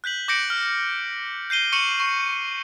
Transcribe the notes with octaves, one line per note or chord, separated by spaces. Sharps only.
F#6 G6 B6 F#7
D6 G6 A#6 C#7 D7 F#7
F6
G6 C7 D#7 G7
C#6 C#7 D#7 E7 F#7 G7
C#6